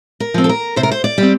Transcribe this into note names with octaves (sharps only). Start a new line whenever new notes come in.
A#4
F3 C4
A4
A#4
C3 C5
A#4
C5
D5
G3 C4